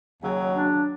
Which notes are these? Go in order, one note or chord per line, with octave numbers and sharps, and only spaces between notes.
D#2 C#3 F#3
D4